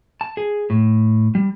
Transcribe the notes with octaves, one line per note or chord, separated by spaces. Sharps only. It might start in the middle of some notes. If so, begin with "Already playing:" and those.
A5
G#4
A2
G3